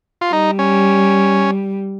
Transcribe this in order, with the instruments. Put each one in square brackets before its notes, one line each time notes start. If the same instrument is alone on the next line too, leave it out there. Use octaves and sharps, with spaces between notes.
[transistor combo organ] F4
[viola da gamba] G3 [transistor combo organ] D#4
[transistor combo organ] C#4